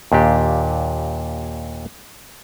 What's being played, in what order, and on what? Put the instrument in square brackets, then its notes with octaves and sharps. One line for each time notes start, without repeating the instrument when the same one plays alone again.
[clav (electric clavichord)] D#2 A#2 D4 G4